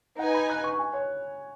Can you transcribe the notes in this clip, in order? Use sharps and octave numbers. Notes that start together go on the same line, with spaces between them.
D#4 B4 F#5 G#5
B5
F#6
C#6
G#5
C#5